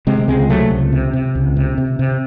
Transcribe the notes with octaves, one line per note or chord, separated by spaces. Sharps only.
C3 G#3 C4
C#2 G#3 C4
C3 F#3 A3
C#2
C3
C3
C#2
C3
C3
C3